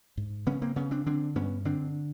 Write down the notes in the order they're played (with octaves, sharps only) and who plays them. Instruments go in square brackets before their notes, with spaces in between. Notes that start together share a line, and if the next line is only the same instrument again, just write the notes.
[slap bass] G#2
C#3 B3 C#4
A#3 C4
C#3 B3 C#4
C4 D4
D3 C4 D4
G2 B3 C#4
D3 C4 D4